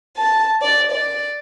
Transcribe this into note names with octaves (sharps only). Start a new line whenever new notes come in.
A5
D5
D5